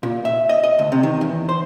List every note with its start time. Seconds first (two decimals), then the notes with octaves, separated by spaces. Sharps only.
0.03 A#2
0.25 E5
0.49 D#5
0.64 D#5
0.79 D2
0.92 C3
1.03 D#3
1.21 E2
1.49 C5